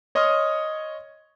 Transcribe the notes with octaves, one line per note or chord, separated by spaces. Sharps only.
C#5 D#5 C6 C#6 D#6 F6